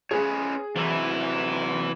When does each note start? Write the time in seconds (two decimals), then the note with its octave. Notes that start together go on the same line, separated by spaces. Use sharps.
0.11 C#4 G#4 B4 C#5
0.76 C3 E3 F#3 E4